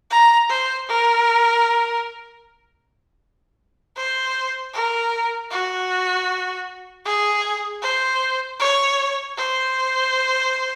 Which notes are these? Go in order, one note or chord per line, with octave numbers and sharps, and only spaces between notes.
A#5
C5
A#4
C5
A#4
F#4
G#4
C5
C#5
C5